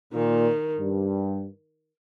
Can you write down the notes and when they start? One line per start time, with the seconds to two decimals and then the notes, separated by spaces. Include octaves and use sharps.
0.13 A#2 D#3
0.78 G2